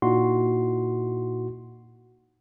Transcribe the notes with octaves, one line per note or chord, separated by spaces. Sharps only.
A#2 D#4 E4 F#4 C6